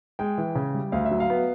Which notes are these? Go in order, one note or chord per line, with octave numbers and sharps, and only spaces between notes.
G#3 G5
E3
C#3
G3
D2 F5
E5
F#3
F5
B3